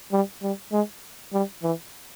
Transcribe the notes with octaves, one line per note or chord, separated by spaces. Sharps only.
G3
G3
G#3
G3
E3